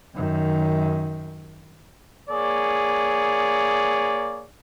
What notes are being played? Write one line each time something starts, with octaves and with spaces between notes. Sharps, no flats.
F#2 D#3
A#3 G#4 C#5 D5